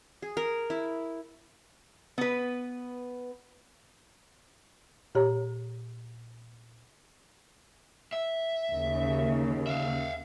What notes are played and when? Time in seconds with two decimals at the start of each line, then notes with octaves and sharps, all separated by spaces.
0.22 G#4
0.37 A#4
0.70 E4
2.18 B3 B4
5.15 A#2 G4 C#5 A#5
8.13 E5
8.73 D#2 C#3
9.67 E5 F5